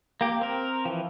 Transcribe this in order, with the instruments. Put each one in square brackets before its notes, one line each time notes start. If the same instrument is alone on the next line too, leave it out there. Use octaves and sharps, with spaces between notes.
[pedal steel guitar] A#3 G4
C4 A#4
E3 F3